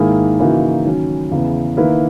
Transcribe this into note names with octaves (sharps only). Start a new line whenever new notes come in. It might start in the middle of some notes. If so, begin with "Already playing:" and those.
Already playing: G#2 D#3 A#3 E4 G#4
C#3 E3 A#3 D#4 F#4
D#3 F#3 C#4
E2 C#3 E3 B3
D#3 A#3 E4 B4